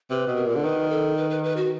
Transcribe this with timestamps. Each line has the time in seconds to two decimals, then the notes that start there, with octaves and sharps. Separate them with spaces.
0.10 C3 B4
0.27 B2
0.36 A#4
0.46 A#2
0.56 D3
0.63 D#3 B4
0.90 A4
1.17 B4
1.30 B4
1.44 B4
1.57 F#4